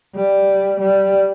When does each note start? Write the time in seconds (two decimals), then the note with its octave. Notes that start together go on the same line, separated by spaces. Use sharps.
0.15 G3
0.81 G3